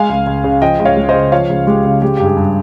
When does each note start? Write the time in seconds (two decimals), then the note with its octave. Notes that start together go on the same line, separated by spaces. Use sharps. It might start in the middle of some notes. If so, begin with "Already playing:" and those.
Already playing: G#3 F5 G#5
0.09 C#2
0.27 C#2
0.44 C#3
0.61 F3 D#5 G5
0.79 C#2
0.85 C#5 F5
0.97 G#3
1.09 C5 D#5
1.15 C#3
1.32 F3 C#5 F5
1.50 C#2
1.67 G#3 G4
1.85 C#3
2.02 G#3 G4
2.17 G2 G4
2.26 G#4
2.37 G2